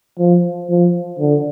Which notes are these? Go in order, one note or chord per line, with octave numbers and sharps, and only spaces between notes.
F3
F3
D3